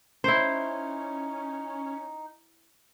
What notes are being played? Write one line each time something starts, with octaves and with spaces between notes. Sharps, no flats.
C#4 D#4 E4 C5